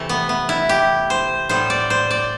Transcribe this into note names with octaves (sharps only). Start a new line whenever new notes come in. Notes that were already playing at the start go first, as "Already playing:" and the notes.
Already playing: C3 E3 A3
B3
B3
E4
G4
C5
A2 G3 B3 C5
D5
C5
D5